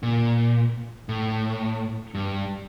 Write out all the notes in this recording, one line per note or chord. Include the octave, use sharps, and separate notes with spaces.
A#2
A2
G2